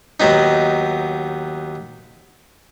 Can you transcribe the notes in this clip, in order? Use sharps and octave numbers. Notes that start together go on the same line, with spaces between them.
D#2 F#3 B3 D#4